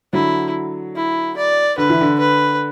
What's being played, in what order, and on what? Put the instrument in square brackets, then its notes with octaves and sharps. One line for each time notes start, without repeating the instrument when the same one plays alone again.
[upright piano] D3 F#3 [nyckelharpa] E4
[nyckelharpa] E4
D5
[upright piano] D3 [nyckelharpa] B4
[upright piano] E3
D3
[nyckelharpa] B4